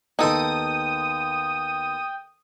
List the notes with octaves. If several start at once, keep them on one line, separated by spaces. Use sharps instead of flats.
D#2 B3 D#4 A4 G5 D#6